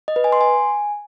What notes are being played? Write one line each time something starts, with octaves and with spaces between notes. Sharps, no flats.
D#5
B4
G#5
C6
G#5